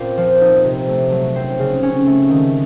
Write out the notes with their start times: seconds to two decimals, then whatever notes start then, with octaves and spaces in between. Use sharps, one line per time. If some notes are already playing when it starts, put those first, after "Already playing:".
Already playing: A#2 C4
0.17 F3
0.41 D#4
0.64 C3
0.88 A3
1.12 F#3
1.36 C4
1.59 C#3
1.83 C#4
2.06 A3
2.29 D#3